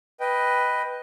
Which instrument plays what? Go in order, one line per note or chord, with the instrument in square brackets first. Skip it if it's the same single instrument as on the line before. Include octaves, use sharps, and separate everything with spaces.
[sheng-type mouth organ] B4 D#5 G5